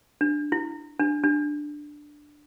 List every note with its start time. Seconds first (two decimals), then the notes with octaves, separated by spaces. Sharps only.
0.21 D4
0.52 E4
0.99 D4
1.24 D4